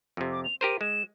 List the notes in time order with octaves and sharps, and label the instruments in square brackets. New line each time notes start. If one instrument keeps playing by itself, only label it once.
[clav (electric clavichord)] F2 C3
[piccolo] D6
F7
[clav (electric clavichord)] G4 A#4 C5 [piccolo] D#7
[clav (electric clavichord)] G#3 [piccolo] E7